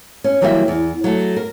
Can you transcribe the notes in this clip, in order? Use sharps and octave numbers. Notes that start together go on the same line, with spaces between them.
C#4
E3 F#3 G3 A#3 D5 E5
E2
F#3 A3
A#4